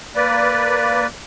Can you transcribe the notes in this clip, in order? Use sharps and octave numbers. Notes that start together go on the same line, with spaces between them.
A#3 B4 D5